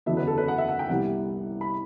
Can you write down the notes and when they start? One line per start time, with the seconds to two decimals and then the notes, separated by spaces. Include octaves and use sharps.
0.06 F#1 E2 D3 F#3 B3 E5
0.17 B4
0.27 A4
0.38 B4
0.48 F#5
0.58 E5
0.69 F#5
0.79 G5
0.89 C2 C3 G3 B3 F#5
1.61 B5